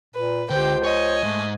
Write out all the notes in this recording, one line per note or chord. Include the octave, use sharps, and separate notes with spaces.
A#2 B4
C#2 D3 G4 C5 G5
C#5 D#5 G#5
G#2 A3